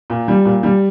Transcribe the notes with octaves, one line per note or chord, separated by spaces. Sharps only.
A#2
G3
A#2
G3